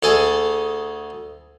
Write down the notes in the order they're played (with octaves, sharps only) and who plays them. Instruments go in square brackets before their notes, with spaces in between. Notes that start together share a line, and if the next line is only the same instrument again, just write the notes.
[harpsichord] D2 G#4 A4 G#5